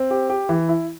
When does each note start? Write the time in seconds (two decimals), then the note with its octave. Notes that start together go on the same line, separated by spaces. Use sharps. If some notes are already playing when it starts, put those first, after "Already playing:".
Already playing: C4
0.11 G4
0.30 G4
0.49 E3
0.69 E4